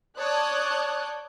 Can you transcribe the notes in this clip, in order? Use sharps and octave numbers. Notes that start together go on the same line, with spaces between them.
C#5 D5 A5 D#6 F#6 G6